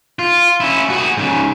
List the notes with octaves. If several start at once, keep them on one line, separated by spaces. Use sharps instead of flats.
F4
C#4 E4
F#4 G#4
G#2 C#3